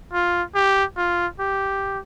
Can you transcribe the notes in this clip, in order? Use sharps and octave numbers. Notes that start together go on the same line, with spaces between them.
F4
G4
F4
G4